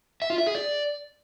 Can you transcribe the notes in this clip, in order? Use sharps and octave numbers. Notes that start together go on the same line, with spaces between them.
E5
F4
E5
G#4
D5